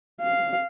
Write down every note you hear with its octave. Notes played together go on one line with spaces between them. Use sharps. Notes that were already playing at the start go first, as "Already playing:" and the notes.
F5